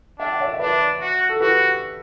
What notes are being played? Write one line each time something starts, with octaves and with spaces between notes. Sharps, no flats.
D4 E5 G5
F#5
C#5 E5
E5
D4 B4 D5
F#4
A4
F#4 G4 B4